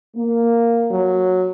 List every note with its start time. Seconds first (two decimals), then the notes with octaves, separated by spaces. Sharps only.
0.16 A#3
0.91 F#3